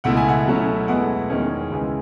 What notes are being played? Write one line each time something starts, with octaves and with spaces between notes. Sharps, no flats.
C#2 B2 A3 E4 F#5
G#5
F#5
B2 F#3 A3 C#4 E4
E2 B2 G#3 B3 E4 F#5
E2 D#3 G#3 C#4
C#2 C#3 E3 G#3